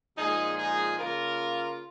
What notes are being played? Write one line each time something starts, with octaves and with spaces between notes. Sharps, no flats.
A#2 F3 G#3 D#4 G#4
D#4 G#4
C#3 A#3 F4 A#4